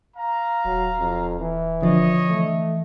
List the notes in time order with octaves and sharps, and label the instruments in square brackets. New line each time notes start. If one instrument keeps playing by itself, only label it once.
[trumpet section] F5 A#5
[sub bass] D#1 [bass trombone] F#3
[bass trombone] F2
E3
[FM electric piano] D3 F3 D4 [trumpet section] C#5 D#5
[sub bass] E3 [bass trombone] A3